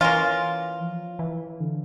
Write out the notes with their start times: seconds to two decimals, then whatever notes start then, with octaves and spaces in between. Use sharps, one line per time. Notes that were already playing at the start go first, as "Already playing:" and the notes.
0.01 E3 A#3 C#4 F4
0.80 F3
1.19 E3
1.60 D3